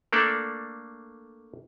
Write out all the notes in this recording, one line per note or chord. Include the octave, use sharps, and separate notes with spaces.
A3 A#3 D4 A4 D5